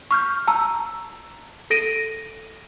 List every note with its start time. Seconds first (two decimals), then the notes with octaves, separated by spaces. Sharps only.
0.11 C#6 F6 G6
0.47 A5 A#5 E6
1.70 A4 A#6 D7 D#7